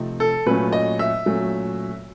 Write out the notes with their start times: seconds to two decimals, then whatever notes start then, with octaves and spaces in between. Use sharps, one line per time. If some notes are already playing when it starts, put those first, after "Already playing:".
Already playing: C3 F3 A3 C4 D#4
0.20 A4
0.46 A#2 F#3 A3 C#4 B4
0.72 D#5
0.99 E5
1.26 A#2 F#3 A3 C#4